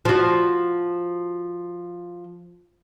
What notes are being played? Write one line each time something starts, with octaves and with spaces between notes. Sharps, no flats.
F3 F#4